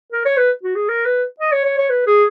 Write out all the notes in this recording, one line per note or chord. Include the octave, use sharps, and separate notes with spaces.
A#4
C#5
B4
F#4
G#4
A#4
B4
D#5
C#5
C#5
C#5
B4
G#4